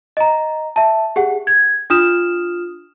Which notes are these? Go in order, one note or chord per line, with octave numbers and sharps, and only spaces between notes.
D#5 A#5
E5 A5
G4 G#4 F#5
G#6
D4 F4 D#6 F6 E7